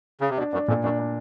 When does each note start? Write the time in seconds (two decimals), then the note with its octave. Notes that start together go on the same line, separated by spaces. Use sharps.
0.21 C#3
0.30 C3
0.38 B2 D4
0.53 F#2 D4
0.68 F2 A#2
0.84 F#2 D4
0.99 D4